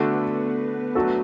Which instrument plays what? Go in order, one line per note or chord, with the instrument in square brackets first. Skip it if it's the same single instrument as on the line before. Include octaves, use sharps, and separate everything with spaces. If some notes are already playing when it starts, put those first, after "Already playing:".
Already playing: [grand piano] D3 A3 D4 F#4 [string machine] B3 B4
[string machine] B3 B4
[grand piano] F#3 A3 D4 F#4 A4